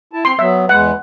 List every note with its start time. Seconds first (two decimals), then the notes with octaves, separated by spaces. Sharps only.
0.13 E4 A5
0.25 C4 C6
0.39 F#3 B3 E5
0.69 E2 G#3 B4 F#5